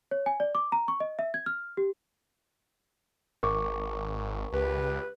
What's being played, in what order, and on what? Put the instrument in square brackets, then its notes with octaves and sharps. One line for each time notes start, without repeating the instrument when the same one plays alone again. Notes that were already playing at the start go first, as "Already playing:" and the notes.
[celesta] C#5
G#5
D5
D6
A#5
C#6
D#5
E5
G#6
F6
G4
[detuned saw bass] G#1 [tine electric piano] A#4 C#6 D6
[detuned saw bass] C#2 [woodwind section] G4 B4